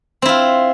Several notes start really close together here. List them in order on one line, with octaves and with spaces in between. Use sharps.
C4 E4 F4